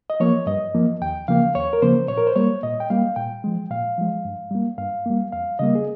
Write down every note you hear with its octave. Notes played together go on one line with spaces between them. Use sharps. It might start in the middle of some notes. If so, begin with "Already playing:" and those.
D#5
F3 A#3 C#5
G2 D#5
F3 A#3
D#2 G5
C#3 F3 A#3 F5
D#2 C#5
A#4
C#3 F3 A#3 C5
A#2 C#5
A#4
C5
G3 A#3 C#5
A#2 D#5
G5
G3 A#3 F5
A#2 G5
F3 G#3
A#2 F5
F3 G#3
G2
G3 A#3
G2 F5
G3 A#3
F2 F5
C#3 G3 A#3 D#5
G#4